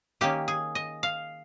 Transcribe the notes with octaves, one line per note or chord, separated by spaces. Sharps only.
D#3 A#3 C#4 G4
G#4
D#5
F5